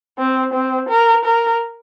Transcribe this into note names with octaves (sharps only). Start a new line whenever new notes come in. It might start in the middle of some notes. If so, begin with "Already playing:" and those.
C4
C4
A#4
A#4